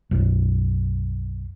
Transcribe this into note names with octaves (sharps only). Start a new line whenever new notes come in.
B1 F#2